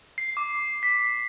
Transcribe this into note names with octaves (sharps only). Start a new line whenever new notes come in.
C7
D6
B6